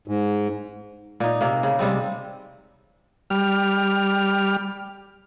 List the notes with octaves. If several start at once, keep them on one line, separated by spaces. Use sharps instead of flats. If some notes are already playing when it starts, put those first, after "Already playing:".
G#2
A#2 D#4
C3 A#3
C#3
C3 G3 G#3 C4
G3 F6